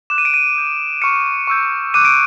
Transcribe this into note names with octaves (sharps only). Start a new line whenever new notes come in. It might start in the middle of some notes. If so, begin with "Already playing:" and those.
D6 F#6 E7
D#7
D7
D#7
D#6 G6
C#6 F6 C#7
C#6 E6 G6
D6 F#6 D#7
D7